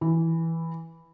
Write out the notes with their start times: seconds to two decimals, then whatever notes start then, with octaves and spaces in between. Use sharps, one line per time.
0.01 E3